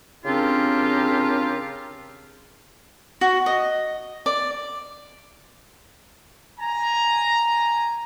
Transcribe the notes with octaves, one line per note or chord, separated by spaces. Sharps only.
C#3 C4 D4 F4 G4 A#4
F#4
D#5
D5
G#5 A#5